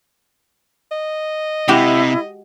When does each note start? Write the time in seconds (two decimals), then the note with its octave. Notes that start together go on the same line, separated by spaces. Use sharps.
0.92 D#5
1.68 C3 G#3 E4 F#4 G4